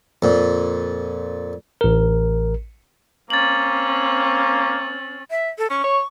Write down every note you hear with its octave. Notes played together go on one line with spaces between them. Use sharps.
F2 A#2
A1 A#4
A#3 C4 C#4 A6 F#7
E5
A4
C#4 C#6
C#5